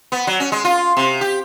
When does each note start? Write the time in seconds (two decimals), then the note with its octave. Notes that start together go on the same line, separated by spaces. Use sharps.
0.12 B3
0.27 F#3
0.40 C#4
0.52 G#3
0.64 F4
0.97 C3
1.21 G4